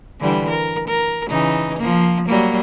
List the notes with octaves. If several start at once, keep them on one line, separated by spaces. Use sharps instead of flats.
D3 E3 G3
A#4
A#4
C#3 E3 D#4
F3 A#3
F#3 G3 A#3